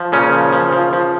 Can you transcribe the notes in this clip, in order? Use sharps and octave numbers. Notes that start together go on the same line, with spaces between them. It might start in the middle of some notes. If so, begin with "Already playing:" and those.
Already playing: F3
A#2 C#3 C#4
F3
F3
F3
F3